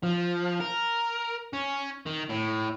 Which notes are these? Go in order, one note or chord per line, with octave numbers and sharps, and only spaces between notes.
F3
A#4
C#4
D#3
A2